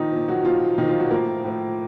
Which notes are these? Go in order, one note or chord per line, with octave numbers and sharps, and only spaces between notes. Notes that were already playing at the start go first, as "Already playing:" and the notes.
Already playing: A#2 D#3 F3 D#4
A#2 F3
F#3 F#4
A#2 F3 F4
A#2 D#3 F3 D#4
F3 F4
F#3 F#4
A2 F3 A#3 A#4
A2 F3